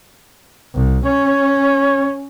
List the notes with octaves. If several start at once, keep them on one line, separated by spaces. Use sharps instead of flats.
C2
C#4 C#5